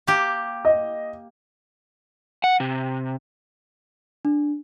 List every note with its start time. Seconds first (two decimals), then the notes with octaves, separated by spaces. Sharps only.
0.07 A#3 G4
0.65 D#5
2.44 F#5
2.60 C3
4.25 D4